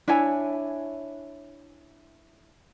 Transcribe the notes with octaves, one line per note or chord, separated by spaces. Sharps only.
D4 E4 C#5 G#5